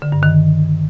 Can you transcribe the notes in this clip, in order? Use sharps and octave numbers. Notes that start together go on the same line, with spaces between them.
D3
G2
D#3